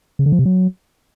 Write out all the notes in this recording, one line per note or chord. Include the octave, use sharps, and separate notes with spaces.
C#3
D3
F3
C3
F#3